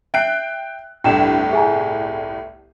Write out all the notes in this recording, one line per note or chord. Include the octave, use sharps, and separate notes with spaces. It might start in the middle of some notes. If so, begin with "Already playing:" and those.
E5 G5 F#6 C7 D7
G1 C2 A2 D4 G5 E7
G#4 E5 G#5 A#5